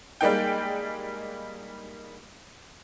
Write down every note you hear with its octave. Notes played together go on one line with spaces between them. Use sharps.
G3 G#3 A#3 D#4 G5